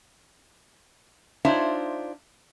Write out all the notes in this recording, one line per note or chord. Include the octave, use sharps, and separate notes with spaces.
D4 D#4 F4 C5 C#5 E5